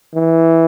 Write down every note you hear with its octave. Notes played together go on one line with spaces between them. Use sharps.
E3